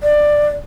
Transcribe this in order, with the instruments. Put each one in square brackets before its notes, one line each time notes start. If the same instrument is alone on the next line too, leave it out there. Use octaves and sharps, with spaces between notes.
[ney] D5